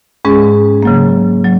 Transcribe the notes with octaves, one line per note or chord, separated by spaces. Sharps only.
G#2 G#3 C#4 G#4
C#3 F#3 A#3
F#3